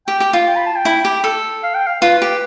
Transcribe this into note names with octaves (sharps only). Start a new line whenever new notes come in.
G4 G5
G4
F4
G5
B5
A5
G5
E4
G4
A4
F5
G5
F5
F4 B4
G4